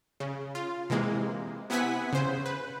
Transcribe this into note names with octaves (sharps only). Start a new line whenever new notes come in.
C#3
F4
C3 E3 G#3 A#3
C3 B3 E4 F#5 G#5 B6
C#3 C5
B4